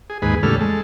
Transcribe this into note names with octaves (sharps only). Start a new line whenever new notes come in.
G#4
D#2 G#2 G#4 B4
E2 A2 C#3 G3 A4 F6
G#3 A4